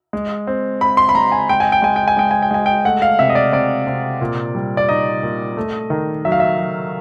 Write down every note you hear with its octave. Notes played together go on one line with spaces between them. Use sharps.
G#3
C4
C4 B5
C6
B5
G#3 A#5
G#5
G#3 G5
G#5
G5
G#3 G#5
G5
G#5
G#3 G5
G#5
G5
G#3 G#5
G5
A3 F#5
F5
C3 E5
D#5
D5
C3 D5
C3
A#2
G3
D5
D#4 D#5
A#2
A3
D#3
F#3 E5
F5
E5
F#3